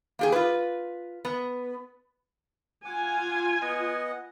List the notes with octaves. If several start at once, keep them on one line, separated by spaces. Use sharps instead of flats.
A#3 G4 G#4
F4 B4
B3
F4 F#5 G#5 D6
B3 D#5 F#5